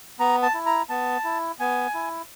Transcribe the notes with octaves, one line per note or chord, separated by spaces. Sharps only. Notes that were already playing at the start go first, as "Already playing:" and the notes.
B3 A#5
A5
E4
A#5
B3 A5
E4
B3 G#5
E4